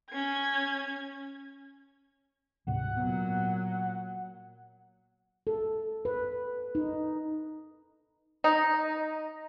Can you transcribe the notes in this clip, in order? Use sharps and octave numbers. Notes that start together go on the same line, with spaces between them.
C#4 G#6
D2 G#2 C3 F#5
A#2 F#3 B3
A4
B4
D#4
D#4